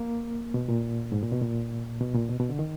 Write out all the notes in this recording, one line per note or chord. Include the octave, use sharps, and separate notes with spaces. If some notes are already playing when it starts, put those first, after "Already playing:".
Already playing: A#3
B2
A#2
G#2
A#2
B2
A#2
B2
A#2
B2
B2
D3
D#3